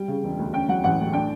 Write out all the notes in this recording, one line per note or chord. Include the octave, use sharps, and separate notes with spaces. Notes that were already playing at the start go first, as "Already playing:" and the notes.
Already playing: G3 G5
C#3
E1
D2
C#4 G5
F#3 F#5
A1 F#5
A2
D4 G5